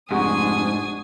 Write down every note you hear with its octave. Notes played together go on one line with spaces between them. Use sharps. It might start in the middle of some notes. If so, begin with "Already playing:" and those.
F1 G#2 D4 G4 F#5 G#5 C#6 D#6